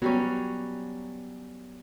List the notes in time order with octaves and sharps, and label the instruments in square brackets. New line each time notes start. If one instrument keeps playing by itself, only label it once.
[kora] F#3 G3 C#4 [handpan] B3